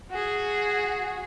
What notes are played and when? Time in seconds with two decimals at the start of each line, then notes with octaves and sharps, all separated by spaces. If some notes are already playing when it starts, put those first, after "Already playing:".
0.11 F#4 G#4